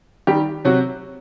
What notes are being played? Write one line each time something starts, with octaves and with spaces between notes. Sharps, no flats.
D#3 G3 G4
C3 F#3 F#4